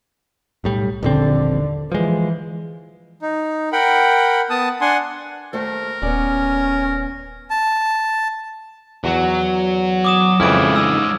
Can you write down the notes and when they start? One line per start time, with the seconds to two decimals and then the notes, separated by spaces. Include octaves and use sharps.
0.64 B1 A2 G3
1.03 D#1 A#1 D3 C4
1.92 E3 F3 G#3
3.22 D#4
3.73 A#4 F#5 G5 B5
4.50 B3 A5 D#6
4.81 D4 F#5 G#5 C6
5.53 D#2 A3 A#4 C5
6.02 D#1 B3 C#4 D5
7.50 A5
9.04 E2 F#3 F#4
10.05 D6 D#6 E7
10.40 F2 C#3 E3 G#3 E4 F6 G#6 D7
10.76 G#3 D#4 E6